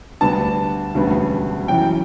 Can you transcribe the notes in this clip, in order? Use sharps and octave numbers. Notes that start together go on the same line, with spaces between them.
D2 D3 G3 B3 D4 A5
E1 D2 C#3 G3 B3
F#2 C#3 E3 G5